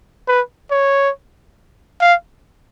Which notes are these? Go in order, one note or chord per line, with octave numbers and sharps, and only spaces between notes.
B4
C#5
F5